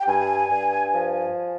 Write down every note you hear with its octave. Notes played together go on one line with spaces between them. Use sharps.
G5
G2 G#5
G2
F3